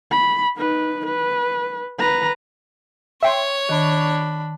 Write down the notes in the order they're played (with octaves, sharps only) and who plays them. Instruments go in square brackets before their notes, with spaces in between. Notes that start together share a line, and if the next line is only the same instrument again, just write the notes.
[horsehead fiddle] B5
D#4 B4
B4
B4 A#5
[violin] C#5 [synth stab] E5 G5 C6
[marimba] D#3 [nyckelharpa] D4 B5